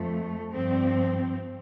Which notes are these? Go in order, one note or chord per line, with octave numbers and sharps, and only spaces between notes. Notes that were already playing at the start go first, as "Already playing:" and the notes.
Already playing: F2 F3 A3
G2 F3 C4